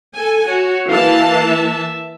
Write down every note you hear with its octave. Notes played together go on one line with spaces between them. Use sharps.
A4 G#5
F#4 C#5
E3 A#3 F5 A5
E5